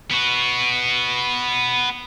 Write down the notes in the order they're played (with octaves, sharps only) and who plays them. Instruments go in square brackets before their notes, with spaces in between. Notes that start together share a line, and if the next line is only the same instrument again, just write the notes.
[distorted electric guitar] B3 F#4